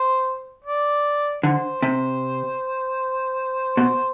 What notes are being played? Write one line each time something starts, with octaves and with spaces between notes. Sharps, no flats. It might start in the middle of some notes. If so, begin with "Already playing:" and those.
Already playing: C5
D5
D3 C5
C3
B2